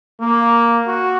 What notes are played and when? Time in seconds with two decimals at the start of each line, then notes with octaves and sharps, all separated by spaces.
0.21 A#3
0.87 F#4